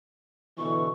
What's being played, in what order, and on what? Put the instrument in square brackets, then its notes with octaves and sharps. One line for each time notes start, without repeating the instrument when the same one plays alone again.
[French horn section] B2 D3 E3 [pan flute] C#6